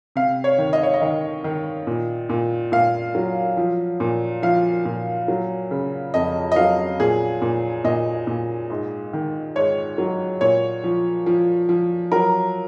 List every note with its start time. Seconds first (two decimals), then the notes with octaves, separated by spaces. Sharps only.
0.16 C3 F5
0.44 C#5
0.58 D#3
0.73 D#5
0.83 C#5
0.94 D#5
1.01 D#3
1.44 D#3
1.87 A#2
2.29 A#2
2.72 A#2 F5
3.15 F#3
3.57 F3
4.00 A#2
4.42 F3 F5
4.85 A#2
5.28 F#3
5.71 C#3
6.14 F2 D#5
6.52 D#5
6.56 F#3 F5
7.00 A#2 G#4
7.42 A#2
7.84 A#2 D#5
8.27 A#2
8.70 G#2
9.13 D#3
9.56 G#2 C#5
9.98 F#3
10.41 A#2 C#5
10.84 F3
11.26 F3
11.69 F3
12.12 F#3 A#4